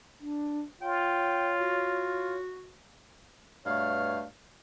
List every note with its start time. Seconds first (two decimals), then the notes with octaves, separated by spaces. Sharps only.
0.20 D4
0.82 F4 C#5 G5
1.61 F#4
3.66 G2 B2 A3 C#5 F5